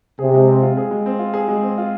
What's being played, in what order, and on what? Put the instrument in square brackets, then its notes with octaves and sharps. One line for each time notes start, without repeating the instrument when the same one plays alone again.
[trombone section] C3 [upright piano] G#4
[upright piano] G#3
C4
F4
G#4
G#3
C4
F4
G#4
G#3
C4
F4